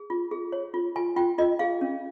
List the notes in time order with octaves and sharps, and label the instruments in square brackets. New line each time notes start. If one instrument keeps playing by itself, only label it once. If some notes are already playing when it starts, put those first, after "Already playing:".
Already playing: [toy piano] G#4
F4
G#4
C#5
F4
F4 G#5
F4 G5
F4 D#5
G#4 F5
C#4